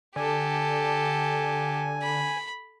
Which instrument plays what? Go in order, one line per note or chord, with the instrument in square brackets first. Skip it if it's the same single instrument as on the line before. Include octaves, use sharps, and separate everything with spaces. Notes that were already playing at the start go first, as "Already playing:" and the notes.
[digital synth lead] D3 [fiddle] G4 A4 [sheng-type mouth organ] G#5
[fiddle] B5